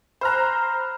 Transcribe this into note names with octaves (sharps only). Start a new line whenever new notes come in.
C5 A#5 B5 F6 F#6